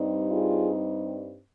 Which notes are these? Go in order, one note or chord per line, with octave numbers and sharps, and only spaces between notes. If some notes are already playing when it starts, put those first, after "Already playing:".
Already playing: G2 G3 C4 D#4
F4 G#4